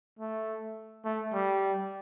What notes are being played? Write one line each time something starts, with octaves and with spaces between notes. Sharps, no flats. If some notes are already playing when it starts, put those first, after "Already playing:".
A3
A3
G3